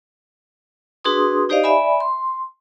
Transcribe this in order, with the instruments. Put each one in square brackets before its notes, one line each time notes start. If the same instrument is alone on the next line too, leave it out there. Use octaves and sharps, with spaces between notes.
[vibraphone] D4 F#4 G#4 B4 C6 D#6
D#4 G4 C5 D5 D#5 F5
D5 E5 G#5 B5
C6